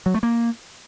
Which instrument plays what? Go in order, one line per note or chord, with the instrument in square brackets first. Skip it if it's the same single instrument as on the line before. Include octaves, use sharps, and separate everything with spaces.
[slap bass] F#3
A3
A#3